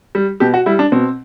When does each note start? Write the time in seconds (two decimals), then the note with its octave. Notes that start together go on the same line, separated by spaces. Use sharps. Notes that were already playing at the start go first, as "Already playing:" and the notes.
0.15 G3
0.40 B2 G4
0.54 F#4
0.66 G3 E4
0.79 D4
0.92 B2 C4